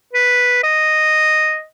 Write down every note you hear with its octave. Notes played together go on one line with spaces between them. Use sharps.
B4
D#5